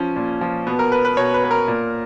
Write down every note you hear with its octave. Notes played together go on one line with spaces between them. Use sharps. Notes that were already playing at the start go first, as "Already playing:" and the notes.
Already playing: F3 C#4
A#2
F3
B2 B3
A#4
B4
B4
B2 C#5
B4
B4
A#4
A#2